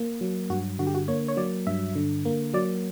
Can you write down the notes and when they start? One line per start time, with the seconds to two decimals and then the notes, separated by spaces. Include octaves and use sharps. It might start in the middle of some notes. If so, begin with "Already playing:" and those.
Already playing: A#3
0.21 F#3
0.50 G2 F#4
0.79 D3 F#4
0.87 G4
0.94 F#4
1.08 A#3 C#5
1.28 C#5
1.37 F#3 D5
1.67 G2 E5
1.95 D3
2.25 A#3
2.54 F#3 D5